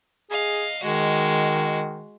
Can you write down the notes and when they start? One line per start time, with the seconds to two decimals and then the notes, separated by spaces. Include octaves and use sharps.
0.31 G#4 D#5 F5
0.83 D#3 G#3 F#4